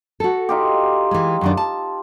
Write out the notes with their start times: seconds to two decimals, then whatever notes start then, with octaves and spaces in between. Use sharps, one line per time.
0.20 F#4 A4
0.49 D#4 F4 G4
1.11 E3 G#3
1.41 F#2 D#3 D4
1.57 A5